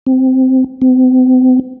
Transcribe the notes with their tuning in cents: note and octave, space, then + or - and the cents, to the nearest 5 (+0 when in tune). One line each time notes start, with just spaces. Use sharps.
C4 -10
C4 -40